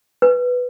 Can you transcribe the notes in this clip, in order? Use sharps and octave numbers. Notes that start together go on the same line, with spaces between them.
B4